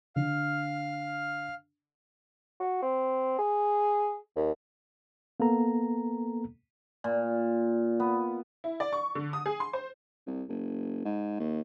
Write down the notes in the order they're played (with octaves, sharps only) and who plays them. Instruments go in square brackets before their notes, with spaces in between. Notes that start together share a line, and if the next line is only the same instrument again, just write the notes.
[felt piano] D3 [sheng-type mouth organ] F5 F6
[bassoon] F#4
C4
G#4
D#2
[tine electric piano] A#3 B3 A4 A#5
[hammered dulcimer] A#2
B3
[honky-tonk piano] E4
D5
C#6
D3
D#6
G#4
C6
C5
[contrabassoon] C2
F#1
G#2
D#2